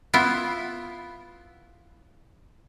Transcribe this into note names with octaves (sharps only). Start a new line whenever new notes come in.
B3 E4 F4